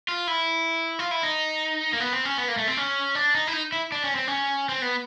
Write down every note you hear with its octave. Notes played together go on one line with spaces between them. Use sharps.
F4
E4
F4
E4
D#4
A#3
B3
C4
C#4
B3
A#3
A3
C4
C#4
D4
D#4
E4
D#4
E4
D4
C#4
C4
C#4
C4
B3